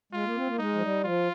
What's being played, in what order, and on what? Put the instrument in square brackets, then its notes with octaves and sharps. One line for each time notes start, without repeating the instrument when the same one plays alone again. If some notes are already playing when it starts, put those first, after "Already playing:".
[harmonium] G#3 [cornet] F4
[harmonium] A#3
C4
A#3
[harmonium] G#3 [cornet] D#4
[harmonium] F3
G3
[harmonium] F3 [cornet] F4